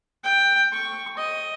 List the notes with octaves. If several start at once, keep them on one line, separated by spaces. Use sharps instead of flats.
G5
C#6
D#5